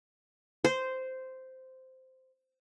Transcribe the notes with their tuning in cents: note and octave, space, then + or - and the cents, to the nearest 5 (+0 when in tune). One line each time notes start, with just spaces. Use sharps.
C5 -10